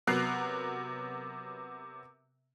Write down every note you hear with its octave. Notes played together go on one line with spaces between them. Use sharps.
C3 F#3 B3 A#4 F#6 C7